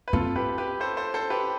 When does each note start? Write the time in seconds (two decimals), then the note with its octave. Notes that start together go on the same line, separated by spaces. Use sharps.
0.08 B4
0.13 C4 F4 A4
0.36 G4 B4
0.58 G4 B4
0.80 A4 C5
0.97 A4 C5
1.14 A4 C5
1.30 G4 B4